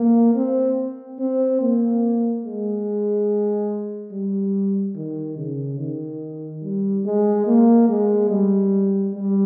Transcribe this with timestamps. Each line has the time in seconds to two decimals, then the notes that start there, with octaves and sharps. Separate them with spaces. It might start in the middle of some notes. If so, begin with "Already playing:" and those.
Already playing: A#3
0.35 C4
1.19 C4
1.61 A#3
2.45 G#3
4.11 G3
4.96 D#3
5.37 C#3
5.79 D#3
6.62 G3
7.05 G#3
7.47 A#3
7.89 G#3
8.30 G3
9.14 G3